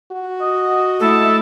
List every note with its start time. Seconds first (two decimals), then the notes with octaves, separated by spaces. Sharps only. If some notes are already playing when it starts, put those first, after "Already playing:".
0.12 F#4
0.41 D#5
1.00 A3 E4 A4